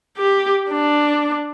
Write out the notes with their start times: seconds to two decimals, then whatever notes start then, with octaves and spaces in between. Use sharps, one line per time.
0.17 G4
0.70 D4